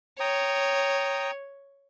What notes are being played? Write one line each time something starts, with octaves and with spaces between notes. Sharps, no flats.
C#5 G5 A#5 D#6